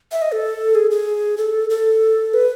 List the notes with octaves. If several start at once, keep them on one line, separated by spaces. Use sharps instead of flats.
E5
D#5
A4
G#4
G#4
A4
A4
B4